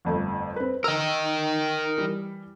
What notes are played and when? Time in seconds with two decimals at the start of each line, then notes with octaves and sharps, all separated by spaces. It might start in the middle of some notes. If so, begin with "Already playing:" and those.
0.05 G1 F2 A3
0.56 C4 B4
0.84 A#4 D#5 E6
1.98 E3 G3